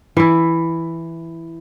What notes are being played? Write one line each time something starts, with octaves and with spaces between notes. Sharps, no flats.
E3 E4